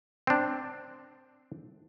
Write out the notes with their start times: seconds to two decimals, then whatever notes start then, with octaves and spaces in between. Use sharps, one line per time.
0.27 C4 D4